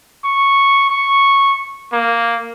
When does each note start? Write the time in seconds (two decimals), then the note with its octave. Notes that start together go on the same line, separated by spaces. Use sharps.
0.24 C#6
0.90 C#6
1.93 A#3